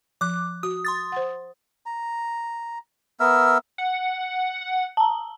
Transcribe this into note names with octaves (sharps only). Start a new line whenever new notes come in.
F3 D6 F#6
F#4 D#6
C6 D#6 A6
C5 F#5
A#5
B3 A#4 E5 E6
F#5
A5 A#5